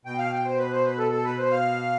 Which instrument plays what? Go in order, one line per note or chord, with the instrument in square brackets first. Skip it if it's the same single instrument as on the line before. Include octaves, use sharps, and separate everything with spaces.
[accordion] B2 G5
F5
G5
C5
B4
C5
B4
A4
A4
B4
C5
F5